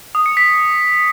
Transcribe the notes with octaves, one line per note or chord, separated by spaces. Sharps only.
D#6
C#7
B6